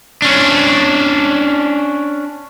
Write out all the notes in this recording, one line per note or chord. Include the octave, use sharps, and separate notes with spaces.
C#4 D4